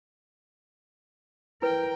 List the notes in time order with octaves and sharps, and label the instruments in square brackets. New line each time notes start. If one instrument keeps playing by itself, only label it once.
[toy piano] E4 B4 [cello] A#4 G5